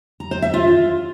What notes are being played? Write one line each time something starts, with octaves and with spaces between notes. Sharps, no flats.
A#5
C5
E5
F4